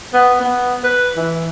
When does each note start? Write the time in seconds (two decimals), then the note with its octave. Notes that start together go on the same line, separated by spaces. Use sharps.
0.14 B3
0.41 B3
0.84 B4
1.17 E3